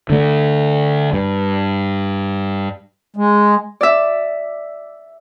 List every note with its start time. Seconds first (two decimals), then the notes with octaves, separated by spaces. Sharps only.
0.10 D3 A3
1.13 G2
3.16 G#3
3.81 D5 E5